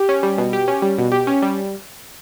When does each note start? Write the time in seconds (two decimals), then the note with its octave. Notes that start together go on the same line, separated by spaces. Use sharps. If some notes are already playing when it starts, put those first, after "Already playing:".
Already playing: G4
0.09 C#4
0.23 G3
0.38 B2
0.53 G4
0.68 C#4
0.82 G3
0.98 B2
1.12 G4
1.27 C#4
1.42 G3